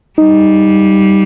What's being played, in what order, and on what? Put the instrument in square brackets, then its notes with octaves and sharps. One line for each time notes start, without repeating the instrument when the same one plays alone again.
[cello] G3 [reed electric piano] D#4